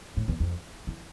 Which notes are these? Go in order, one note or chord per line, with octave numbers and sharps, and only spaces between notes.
A2
E2
F2
E3